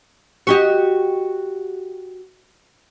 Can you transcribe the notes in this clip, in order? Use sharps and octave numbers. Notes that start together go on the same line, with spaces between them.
F#4 G4 D#5